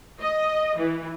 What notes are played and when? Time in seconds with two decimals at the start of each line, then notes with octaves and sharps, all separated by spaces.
0.21 D#5
0.77 E3